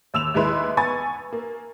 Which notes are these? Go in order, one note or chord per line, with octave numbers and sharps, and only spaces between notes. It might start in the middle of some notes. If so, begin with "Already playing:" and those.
D#2 E6 E7 F7
D#2 G#3 E4 B4 C6
B3 G#5 C#6 A6
A#3